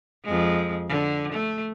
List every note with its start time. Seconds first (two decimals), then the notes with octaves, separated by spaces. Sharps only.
0.25 F2 G#3
0.89 D3
1.33 A3